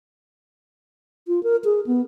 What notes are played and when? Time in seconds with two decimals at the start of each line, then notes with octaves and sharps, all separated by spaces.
1.28 F4
1.43 A#4
1.65 G#4
1.87 B3